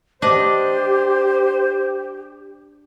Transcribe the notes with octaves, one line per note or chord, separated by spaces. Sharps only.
D4 G4 C5 D5 D#5